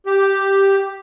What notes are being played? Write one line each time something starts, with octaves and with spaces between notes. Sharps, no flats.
G4